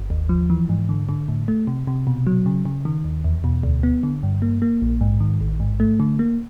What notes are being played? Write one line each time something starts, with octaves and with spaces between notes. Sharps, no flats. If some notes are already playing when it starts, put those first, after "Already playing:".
Already playing: G1
D#2
F3
E3
G#2
D3
D3
A2
A3
C3
C3
B2
F#3
C#3
C#3
D#3
D#2
E2
B2
D2
B3
D3
G2
A#3
A#3
A#1
G#2
D#3
A1
G#2
A3
D3
A#3